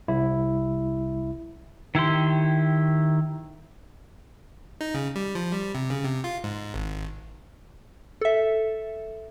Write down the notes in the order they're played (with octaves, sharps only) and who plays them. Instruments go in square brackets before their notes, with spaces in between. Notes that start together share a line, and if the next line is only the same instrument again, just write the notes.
[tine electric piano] C2 E4
[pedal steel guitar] D#3 E4 G4 C6
[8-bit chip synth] D#4
C#3
G3
F3
G3
C3
C#3
C3
F4
G#2
G#1
[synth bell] A4 E5